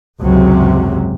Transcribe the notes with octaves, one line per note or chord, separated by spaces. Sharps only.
G#1 C#2 F#2 C3 F#3